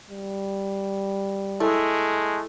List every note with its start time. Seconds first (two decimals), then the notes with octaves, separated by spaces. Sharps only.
0.10 G3
1.60 G#3 A3 E4 A4